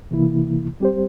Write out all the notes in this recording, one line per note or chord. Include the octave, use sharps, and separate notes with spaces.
C3 E3 A#3 E4
G3 C4 G4 C5